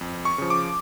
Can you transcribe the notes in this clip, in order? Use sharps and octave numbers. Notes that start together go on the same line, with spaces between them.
F2
C#6
C#3 F3
D6